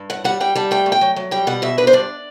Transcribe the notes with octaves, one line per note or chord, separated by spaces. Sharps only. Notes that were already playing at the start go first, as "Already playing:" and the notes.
Already playing: G2
A2 F#5
G3 F#5
G3 G5
G3 A5
A3 G5
A3
G5
F#3
F#3
G3 G5
B2 F#5
B2 E5
D4 B4
C5
G2 D5